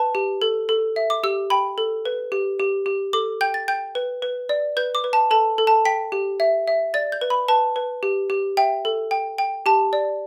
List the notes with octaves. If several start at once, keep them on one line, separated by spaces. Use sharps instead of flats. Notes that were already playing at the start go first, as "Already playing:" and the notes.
Already playing: B4 A5
G4
A4
A4
E5
D6
G4 E6
G5 B5
A4
B4
G4
G4
G4
A4 D6
G5 G6
A6
G5 G6
B4
B4
D5
B4 G6
D6
B4
A5
A4 A5
A4
A5
G5 B6
G4
E5
E5
D5 A6
G6
B4
B5
B4 A5
B4
G4
G4
E5 G5
A4
G5
G5
G4 A5
D5